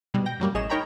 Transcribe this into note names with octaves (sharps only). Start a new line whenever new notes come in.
G#2 B2 G3
G5 A#6
F#2 F#3 G3 A#3
A1 G#4 C#5 D#5 E7
D#4 A#4 C#5 G5 A#5 B5